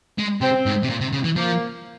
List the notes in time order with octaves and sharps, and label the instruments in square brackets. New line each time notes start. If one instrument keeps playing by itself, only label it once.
[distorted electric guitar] G#3
[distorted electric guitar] C3 [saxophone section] C4
[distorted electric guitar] G#2
C3
A#2
C3
C#3
E3
[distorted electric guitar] F3 [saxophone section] A#3